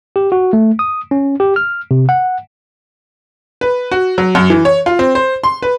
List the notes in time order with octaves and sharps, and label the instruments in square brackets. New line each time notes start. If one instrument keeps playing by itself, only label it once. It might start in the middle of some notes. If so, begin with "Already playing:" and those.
[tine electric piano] G4
F#4
A3
D#6
C#4
G4
F6
C3
F#5
[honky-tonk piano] B4
F#4
F#3
F#2
E3
C#5
F4
C4
C5
C6
B4